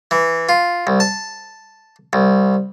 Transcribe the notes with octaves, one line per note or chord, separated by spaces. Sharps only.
E3
F4
C2
A5
C2